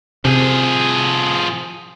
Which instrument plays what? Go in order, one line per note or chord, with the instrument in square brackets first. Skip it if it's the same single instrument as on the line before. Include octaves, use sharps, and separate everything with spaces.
[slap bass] C3 [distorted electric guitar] F3 G#4